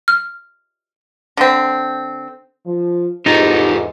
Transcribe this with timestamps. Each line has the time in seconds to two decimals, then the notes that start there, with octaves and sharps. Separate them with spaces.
0.08 F6
1.37 D3 C4
2.66 F3
3.26 E2 G#2 D#4 F4 G4 A4